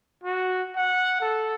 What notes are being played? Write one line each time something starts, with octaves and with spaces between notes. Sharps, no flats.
F#4
F#5
A4